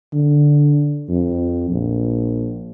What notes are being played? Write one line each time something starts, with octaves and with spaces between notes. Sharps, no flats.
D3
F2
A#1